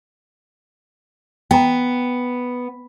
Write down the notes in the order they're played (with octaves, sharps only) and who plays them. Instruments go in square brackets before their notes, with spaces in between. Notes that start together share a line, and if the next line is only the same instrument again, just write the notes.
[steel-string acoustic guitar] B3 [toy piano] G5 A#5